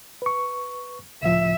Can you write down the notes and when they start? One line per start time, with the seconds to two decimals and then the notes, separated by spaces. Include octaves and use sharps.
0.22 B4 C#6
1.23 C#2 A2 F3 E5